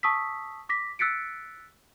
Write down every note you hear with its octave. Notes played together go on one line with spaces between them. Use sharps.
A5 C#6 D#6 E6 B6
D6 A#6 B6
E6 F#6 A6 B6 C#7 D7